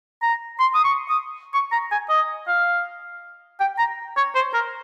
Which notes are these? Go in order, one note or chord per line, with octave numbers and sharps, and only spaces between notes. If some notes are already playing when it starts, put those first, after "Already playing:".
A#5
C6
D#6
C#6
D#6
C#6
A#5
G#5
D#5
F5
G5
A#5
C#5
C5
A#4